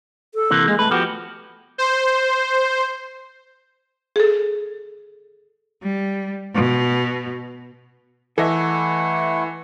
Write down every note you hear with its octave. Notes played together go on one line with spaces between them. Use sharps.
A4
C3 E3 A#3
G#3 A#3
A3 B4
F3 B3 F#4 G4
C5
G#4 A4
G3
B2
E3 A3 E4 A4 D#5 E5 F#5